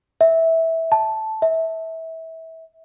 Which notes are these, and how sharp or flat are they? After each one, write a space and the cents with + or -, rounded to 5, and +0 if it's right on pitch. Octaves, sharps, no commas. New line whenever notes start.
E5 -15
A5 -5
E5 -25